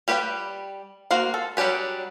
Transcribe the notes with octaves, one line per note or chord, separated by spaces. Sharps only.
G3 G4 B4 C5 G5
A#3 F#4 C5 F5
A4
F#3 G3 D4 G4 B4